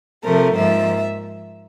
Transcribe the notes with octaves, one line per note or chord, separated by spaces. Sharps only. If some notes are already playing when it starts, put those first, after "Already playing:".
C3 F3 A3 A#4
G#2 F3 A#3 E5